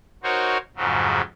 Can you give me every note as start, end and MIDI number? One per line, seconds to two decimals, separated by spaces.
0.23 0.58 63
0.23 0.58 66
0.23 0.58 70
0.23 0.58 72
0.23 0.58 73
0.76 1.21 41
0.76 1.21 44
0.76 1.21 49
0.76 1.21 54